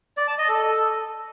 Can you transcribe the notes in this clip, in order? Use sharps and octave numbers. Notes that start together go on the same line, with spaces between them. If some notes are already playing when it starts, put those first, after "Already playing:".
D5
A5
D#5
A4